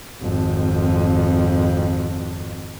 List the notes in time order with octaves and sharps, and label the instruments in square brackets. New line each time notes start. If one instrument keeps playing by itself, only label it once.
[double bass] G#1 F2